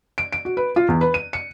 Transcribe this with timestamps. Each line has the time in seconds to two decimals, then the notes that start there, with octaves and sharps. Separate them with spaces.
0.18 D7
0.32 D7
0.45 F#4
0.57 B4
0.76 F4
0.88 E2
1.01 B4
1.14 D#7
1.33 C#7